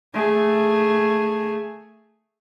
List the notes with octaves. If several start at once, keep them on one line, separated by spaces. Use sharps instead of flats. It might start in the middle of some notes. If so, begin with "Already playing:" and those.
A3 G#4